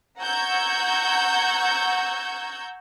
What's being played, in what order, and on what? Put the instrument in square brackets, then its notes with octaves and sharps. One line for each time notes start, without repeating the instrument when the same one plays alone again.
[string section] F#5 A#5 C#6 E6 G6 G#6